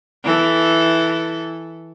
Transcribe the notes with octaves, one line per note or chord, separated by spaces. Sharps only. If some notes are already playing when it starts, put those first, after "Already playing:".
E3 A4